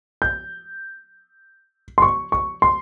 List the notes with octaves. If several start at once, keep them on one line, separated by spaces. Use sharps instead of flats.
G6
C6
C#6
C#6
C6